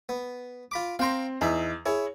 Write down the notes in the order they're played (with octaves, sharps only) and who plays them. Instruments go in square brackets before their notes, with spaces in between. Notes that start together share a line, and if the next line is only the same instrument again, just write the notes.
[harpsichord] B3
F4 B5 D6
[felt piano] C4 C6 [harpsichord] F5 G5 A#5
[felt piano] E2 [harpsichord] D#4 E5
[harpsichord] E4 G#4 [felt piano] C#5